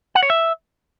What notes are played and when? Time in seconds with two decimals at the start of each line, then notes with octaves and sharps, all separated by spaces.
0.15 F#5
0.23 C#5
0.30 E5